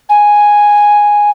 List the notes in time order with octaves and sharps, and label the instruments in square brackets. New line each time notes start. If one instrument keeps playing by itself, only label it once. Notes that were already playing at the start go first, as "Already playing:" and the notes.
[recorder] G#5